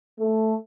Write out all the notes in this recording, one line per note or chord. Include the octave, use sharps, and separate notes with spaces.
A3